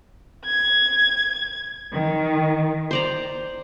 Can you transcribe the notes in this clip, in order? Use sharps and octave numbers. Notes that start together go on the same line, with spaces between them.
G#6
D#3
C5 D5 A#5